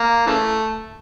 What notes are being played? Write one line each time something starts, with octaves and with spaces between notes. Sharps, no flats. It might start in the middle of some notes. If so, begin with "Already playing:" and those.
Already playing: A#3
C#3 E3 A3